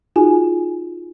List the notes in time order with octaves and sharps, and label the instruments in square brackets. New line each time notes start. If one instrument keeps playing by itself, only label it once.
[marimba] D#4 F4 F#4 G#4 G#5